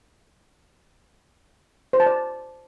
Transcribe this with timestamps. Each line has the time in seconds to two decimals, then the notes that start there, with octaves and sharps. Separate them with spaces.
1.93 C5
2.00 A5
2.06 D5